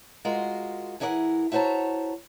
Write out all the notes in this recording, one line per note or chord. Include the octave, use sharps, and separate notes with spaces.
G#3 F4 F#4 A#4
E3 E4 G#4 A#4 D5 F#5
E4 F#4 C5 C#5 A5 A#5